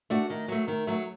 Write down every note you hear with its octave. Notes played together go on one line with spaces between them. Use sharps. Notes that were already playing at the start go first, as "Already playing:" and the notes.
A3 D4 F#4
D#3
F#3 A3
D#3
F#3 A3